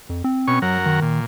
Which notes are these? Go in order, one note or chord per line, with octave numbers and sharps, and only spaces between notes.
F2
C4
B2 C#4 C#6
F#2 F#3 A#4 F#5
D#3
A#2